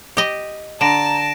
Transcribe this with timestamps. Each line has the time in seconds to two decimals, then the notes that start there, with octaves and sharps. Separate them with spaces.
0.17 G4 D#5
0.81 D3 A5 A#5 A#6 D7 E7